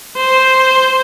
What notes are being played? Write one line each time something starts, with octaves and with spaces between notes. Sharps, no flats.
C5